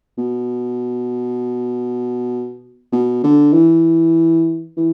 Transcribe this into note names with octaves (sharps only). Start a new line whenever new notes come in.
B2
B2
D3
E3
E3